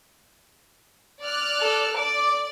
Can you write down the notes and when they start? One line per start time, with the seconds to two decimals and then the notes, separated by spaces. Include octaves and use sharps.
1.22 D5 F6 F#6
1.60 A4
1.96 D5 D6